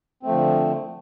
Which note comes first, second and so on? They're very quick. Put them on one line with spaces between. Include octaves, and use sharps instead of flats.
C4 A3 F3 D3